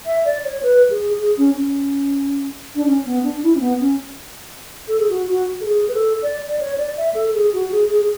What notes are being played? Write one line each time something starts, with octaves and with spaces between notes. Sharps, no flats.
E5
D5
C#5
B4
G#4
G#4
C#4
C#4
D4
C#4
B3
D4
E4
C#4
B3
C#4
A4
G#4
F#4
F#4
A4
G#4
B4
A4
D5
D5
C#5
D5
E5
A4
A4
G#4
F#4
G#4
G#4
G#4